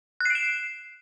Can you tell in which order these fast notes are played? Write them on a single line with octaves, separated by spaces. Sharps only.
F#6 C7 D7 E7